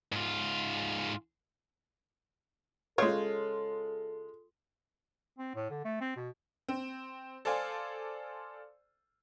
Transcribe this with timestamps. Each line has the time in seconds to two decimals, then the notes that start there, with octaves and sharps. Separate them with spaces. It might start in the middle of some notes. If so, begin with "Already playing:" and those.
0.12 G#2 F4
2.98 C#3 G#3 F4 A4 C#5
5.38 C4
5.55 A2
5.70 D3
5.85 A3
6.01 C4
6.17 B2
6.68 C4
7.45 A4 C5 D5 F5 G#5